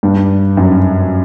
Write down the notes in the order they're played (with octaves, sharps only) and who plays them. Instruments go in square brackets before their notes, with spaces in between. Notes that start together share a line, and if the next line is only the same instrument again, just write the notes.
[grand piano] G2
F#2